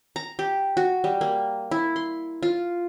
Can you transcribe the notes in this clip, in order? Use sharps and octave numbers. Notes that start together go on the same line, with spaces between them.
A#5
G4
F#4
G3
A#3
E4
C6
F4